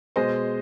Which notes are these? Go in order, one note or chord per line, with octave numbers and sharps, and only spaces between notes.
B2 G#3 C5 D#5